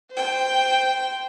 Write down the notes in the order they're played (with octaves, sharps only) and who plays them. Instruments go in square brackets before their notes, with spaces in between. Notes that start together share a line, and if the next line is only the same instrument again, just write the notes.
[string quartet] C5 G5